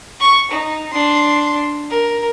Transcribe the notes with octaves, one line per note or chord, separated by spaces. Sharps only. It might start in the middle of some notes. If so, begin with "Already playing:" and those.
C#6
D#4
D4 C6
A#4